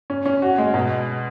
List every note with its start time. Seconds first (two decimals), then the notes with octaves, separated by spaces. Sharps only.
0.10 C#4
0.26 C#4
0.42 F#4
0.58 G#3
0.74 B2